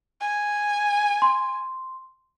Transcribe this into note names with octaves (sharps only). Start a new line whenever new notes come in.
G#5
C6